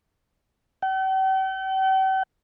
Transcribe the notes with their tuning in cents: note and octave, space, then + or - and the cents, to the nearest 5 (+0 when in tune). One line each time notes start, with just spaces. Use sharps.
G5 -45